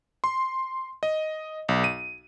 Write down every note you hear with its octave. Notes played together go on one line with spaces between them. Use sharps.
C6
D#5
B1
D#7